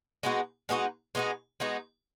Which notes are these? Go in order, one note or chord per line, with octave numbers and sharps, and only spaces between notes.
G#3 B3 D#4 F#4
G#3 B3 D#4 F#4
G#3 B3 D#4 F#4
G#3 B3 D#4 F#4